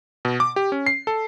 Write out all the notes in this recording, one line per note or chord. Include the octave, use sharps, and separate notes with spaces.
B2
D6
G4
C#4
C7
A4